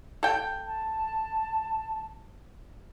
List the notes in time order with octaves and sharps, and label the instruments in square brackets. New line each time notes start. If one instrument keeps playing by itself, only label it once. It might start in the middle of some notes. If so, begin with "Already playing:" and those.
[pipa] A4 G5
[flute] A5